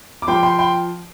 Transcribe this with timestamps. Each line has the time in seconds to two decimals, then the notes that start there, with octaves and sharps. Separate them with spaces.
0.22 D6
0.28 F3 G5 C6
0.43 G5 C6
0.59 G5 C6